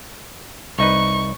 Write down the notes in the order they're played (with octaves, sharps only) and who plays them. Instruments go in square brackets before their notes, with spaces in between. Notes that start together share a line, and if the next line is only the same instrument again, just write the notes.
[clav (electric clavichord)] C2 D#4 B4 [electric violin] C#6